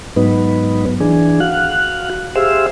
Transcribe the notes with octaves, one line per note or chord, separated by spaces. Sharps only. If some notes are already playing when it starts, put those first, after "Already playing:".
G#2 F#3 B3 D#4 B4
E3 D4 G#4
F#4 F5 F#6
G4 G#4 C5 E5 F5 E6